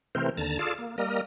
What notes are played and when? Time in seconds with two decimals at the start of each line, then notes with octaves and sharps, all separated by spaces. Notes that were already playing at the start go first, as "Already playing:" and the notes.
0.15 C3 E3 A3 C4 A#4 C5
0.37 D#2 D3 A5 A#5 A6
0.59 F4 G#4 A4 D5 F5 A5
0.79 A#3
0.98 G3 A#3 A#4 D#5